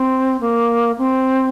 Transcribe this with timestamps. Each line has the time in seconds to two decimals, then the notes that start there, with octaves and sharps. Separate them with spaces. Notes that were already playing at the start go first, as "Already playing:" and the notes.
Already playing: C4
0.41 A#3
0.98 C4